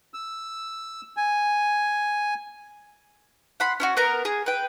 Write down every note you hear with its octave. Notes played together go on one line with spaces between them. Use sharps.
E6
G#5
F#5 B5 C6
C#4 E4 F#4
B3 A#4 A#5
G#4
B4 G5